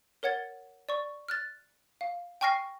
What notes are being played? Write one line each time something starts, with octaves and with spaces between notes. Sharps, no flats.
A#4 C#5 F#5 G#6 A6
D5 C#6
F6 F#6 A6
F5
G5 G#5 C#6 F6 A#6 C7